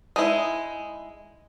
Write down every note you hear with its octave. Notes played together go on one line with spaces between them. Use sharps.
G#3 D#4 E4